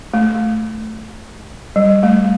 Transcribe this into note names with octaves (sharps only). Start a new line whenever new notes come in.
A3
G3
A3